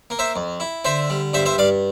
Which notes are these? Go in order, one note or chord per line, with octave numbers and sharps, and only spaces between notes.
A#3
C5 E5
F2
E4
D3 C5 E5
G3
G2 C5 E5
C5 E5
G2 D5 F5